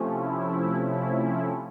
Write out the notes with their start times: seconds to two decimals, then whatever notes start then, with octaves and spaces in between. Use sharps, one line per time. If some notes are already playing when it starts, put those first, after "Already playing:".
Already playing: C3 F3 A3 C#4
0.13 E4
0.83 E4